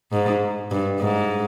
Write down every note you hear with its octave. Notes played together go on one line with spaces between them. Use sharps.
G#2
G2
G#2